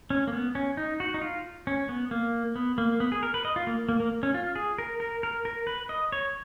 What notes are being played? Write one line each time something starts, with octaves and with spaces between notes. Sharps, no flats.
C#4
A#3
B3
C#4
D#4
F#4
D#4
F4
C#4
B3
A#3
B3
A#3
B3
G#4
A#4
B4
D#5
F4
A#3
A#3
A#3
C#4
F4
G#4
A#4
A#4
A#4
A#4
B4
D#5
C#5